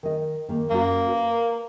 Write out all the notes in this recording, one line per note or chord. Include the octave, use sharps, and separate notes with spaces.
D#3 D#5
D#3 A#3 D#4
F#2 A#3 F#4
A#4 B4